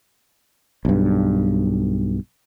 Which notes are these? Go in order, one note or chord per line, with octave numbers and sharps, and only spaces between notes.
B1 G2